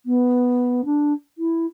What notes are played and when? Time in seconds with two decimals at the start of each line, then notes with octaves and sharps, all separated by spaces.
0.06 B3
0.85 D4
1.38 E4